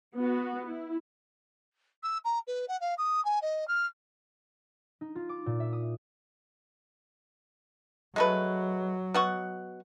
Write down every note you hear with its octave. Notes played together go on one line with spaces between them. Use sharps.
B3 F#4
E4
E6
A#5
B4
F#5
F5
D#6
G#5
D#5
F6
D#4
F4
D6
A#2
E5
D#6
F#3 G#3 A3 B4
B2 F#5 C#6